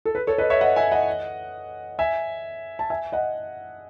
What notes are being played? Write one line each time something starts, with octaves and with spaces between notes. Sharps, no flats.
A4
B4
A4 C#5
B4 D#5
C#5 E5
D#5 F#5
E5 G#5
D#5 F#5
E5 G#5
A5
E5 G#5
D#5 F#5